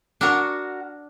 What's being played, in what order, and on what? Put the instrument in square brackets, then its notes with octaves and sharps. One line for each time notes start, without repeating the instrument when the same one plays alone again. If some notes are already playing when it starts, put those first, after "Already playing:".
[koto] D4 [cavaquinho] F#4 A#4 F#5